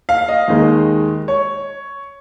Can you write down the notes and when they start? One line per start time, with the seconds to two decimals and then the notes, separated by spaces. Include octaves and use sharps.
0.09 F5
0.29 D#5
0.48 D#2 D#3 G#3
1.28 C#5